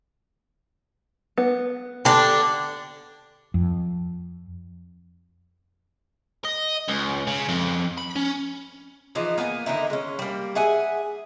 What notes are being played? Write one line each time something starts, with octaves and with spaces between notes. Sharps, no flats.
B3
D3 D4 G4
F2
D#5
C#2
C#3
F2
B5
C#4
E3 F3 D#4 G#4
A#3 B3 G5 G#5
D3 D#3 D#4 E4
G#3 C#4
G3 A#3
G#4 E5 F#5 G#5